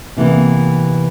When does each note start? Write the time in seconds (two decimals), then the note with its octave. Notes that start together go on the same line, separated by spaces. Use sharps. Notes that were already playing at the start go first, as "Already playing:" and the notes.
0.17 C3 E3 A#3 B3